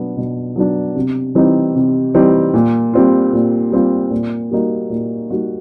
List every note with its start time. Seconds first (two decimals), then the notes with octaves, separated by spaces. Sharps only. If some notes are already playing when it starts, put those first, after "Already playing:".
Already playing: B2 F#3 B3 D4
0.17 B2
0.56 F#3 B3 D4
0.96 C3
1.35 E3 G3 C4 D#4
1.75 C3
2.15 E3 G3 C4 D#4
2.54 A#2
2.94 G3 C4 F4
3.33 A#2
3.72 G3 C4 F4
4.11 A#2
4.51 G3 A#3 D#4 F#4
4.90 A#2
5.30 G3 A#3 D#4 F#4